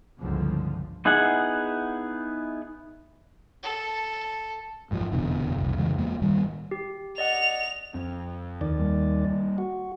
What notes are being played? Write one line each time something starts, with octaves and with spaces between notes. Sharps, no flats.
G1 C#2 G2 D3 E3 F3
B3 D#4 E4 G#4 F#5
A4
A1 G#2 B2 F3
F1 E2 B2 D3
F1 C2
F2 C#3 E3 G#3
E2 G#3 A#3
A2 D#3 G3
G4
D5 D#5 F#5 F7
F2 C4
D#2 D#3 D5
G3 A#3
F#4